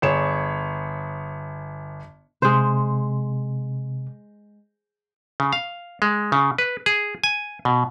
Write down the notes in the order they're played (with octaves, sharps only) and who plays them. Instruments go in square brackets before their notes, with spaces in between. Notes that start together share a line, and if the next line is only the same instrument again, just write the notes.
[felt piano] G1 G#4 C#5 E7
[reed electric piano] C3 [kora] G#3 C5
[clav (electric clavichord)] C#3
F5
G#3
C#3
B4
G#4
G#5
B2